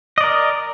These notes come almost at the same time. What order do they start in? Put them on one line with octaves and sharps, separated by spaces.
D#5 D5 A#4